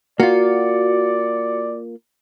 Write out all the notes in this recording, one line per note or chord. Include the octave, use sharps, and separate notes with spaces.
A#3 F4 F#4 D5